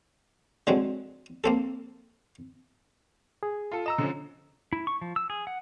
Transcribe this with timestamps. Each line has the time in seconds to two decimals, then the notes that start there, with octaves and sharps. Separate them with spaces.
0.67 D3 F#3 G#3 C4
1.44 A#3 C4 A4
3.43 G#4
3.71 F4 A4
3.86 D#5 A#5 E6 E7
3.98 D3 F3 C#4
4.73 E4
4.87 C#6
5.01 F3
5.16 E6
5.30 G#4
5.47 F#5